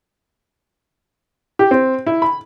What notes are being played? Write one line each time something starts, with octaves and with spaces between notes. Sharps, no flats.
G4
C4
E4
B5